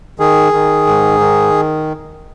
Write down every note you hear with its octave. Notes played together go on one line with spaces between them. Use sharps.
D#3 G#4
D#3
G#2
D#3